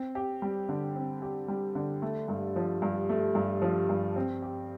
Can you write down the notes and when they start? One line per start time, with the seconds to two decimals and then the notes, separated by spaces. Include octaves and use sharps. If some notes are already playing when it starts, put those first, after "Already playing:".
Already playing: C4
0.15 G4
0.42 G3
0.69 D3
0.96 C4
1.22 G4
1.48 G3
1.75 D3
2.02 A3
2.28 G2
2.56 F3
2.82 G2
3.09 A3
3.35 G2
3.62 F3
3.89 G2
4.16 C4
4.42 G4